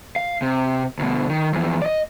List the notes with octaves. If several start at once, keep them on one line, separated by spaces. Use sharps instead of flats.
F5
C3
D2 B2
D#3
F2 E3
D5 D#5